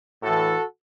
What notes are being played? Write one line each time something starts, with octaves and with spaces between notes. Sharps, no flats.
A2 E3 F#4 A4